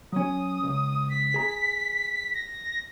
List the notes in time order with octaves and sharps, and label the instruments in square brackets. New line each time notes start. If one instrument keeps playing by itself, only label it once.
[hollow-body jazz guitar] F#3 C#4 [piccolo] D#6
[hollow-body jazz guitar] C#2
[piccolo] B6
[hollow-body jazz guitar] G#4 A#5
[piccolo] A#6